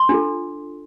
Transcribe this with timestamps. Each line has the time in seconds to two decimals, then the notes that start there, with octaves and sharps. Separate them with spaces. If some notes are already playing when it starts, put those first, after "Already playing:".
Already playing: C6
0.09 D4 F4 A4